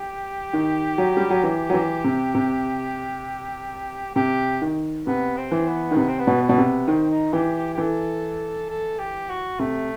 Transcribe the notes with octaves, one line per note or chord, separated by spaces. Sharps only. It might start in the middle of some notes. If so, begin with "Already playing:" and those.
Already playing: G4
D#3
F#3
G3
F#3
E3 G4
F#3
E3
C3
C3
C3 G4
D#3
C3 B3
C4
E3
B3
D#3
C3 B3
C4
B3
B2
B3
B2
C3
D#3 C4
D#4
E3 G4
G4
G4
E3 A4
A4
G4
F#4
C3 A3